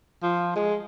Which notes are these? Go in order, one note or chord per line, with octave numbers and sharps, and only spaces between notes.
F3
G#3